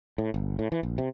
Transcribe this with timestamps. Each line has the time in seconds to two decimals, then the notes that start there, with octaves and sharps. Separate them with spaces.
0.18 A2
0.34 G1
0.59 A2
0.72 E3
0.83 A#1
0.98 C3